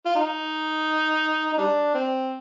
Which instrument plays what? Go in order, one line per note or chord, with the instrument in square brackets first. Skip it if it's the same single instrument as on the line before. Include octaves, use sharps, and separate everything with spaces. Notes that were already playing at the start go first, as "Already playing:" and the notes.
[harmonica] F4
D#4
D#4
G3 D4
C4